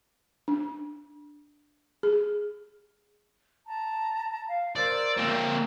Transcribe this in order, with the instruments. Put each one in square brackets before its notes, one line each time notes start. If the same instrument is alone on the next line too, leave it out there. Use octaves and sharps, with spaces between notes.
[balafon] D4
G#4
[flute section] A5 A#5
F5
[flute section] A#4 C5 E6 [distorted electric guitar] D5
[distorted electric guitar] A#3 C4